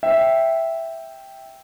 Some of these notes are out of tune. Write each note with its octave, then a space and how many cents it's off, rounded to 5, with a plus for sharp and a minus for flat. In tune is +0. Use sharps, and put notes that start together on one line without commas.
E5 +0 G5 +0